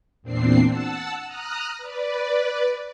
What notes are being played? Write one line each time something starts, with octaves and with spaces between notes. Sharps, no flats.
E2 A#2 C4 D4 C7
F#5 A5 E6
A#5 D#6 F6 F#6
B4 D5